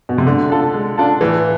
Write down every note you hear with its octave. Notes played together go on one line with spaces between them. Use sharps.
B2
C3
D3 G#3
D4 F4 A4
G#3
D4 F4 A4
A2 E3